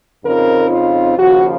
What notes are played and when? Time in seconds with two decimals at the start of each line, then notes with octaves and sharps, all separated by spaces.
0.24 F2 C#3 F3 C4 D#4 A#4
0.70 F4
1.16 D#2 C#3 F3 F#4